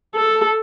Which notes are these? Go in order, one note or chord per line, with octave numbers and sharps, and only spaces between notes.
A4